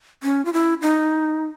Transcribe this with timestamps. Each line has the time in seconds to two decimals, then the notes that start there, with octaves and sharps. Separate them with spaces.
0.23 C#4
0.45 F4
0.53 E4
0.82 D#4